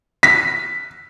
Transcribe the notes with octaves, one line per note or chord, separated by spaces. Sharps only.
B6